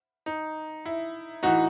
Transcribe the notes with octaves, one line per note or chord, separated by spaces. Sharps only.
D#4
E4
A2 E3 D#4 F#4